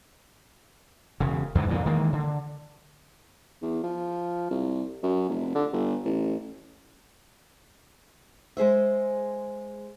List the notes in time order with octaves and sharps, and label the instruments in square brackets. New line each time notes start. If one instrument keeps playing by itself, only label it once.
[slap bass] E1 C#3
E2 G#2 D3 E3
F2 A#2 D3 E3
D#3 E3 G#3 A#3
D3
[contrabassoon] E2
F3
C2
F#2
F1
D3
G1
A1
[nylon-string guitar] G#3 G#4 C5 E5